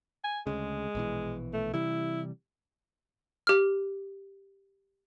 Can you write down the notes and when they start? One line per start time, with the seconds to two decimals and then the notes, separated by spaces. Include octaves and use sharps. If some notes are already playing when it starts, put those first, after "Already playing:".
0.24 G#5
0.47 D2 C#3 G#3
0.95 A#1 B2 E3
1.54 A3
1.74 C3 E3 G3 E4
3.47 G4 F6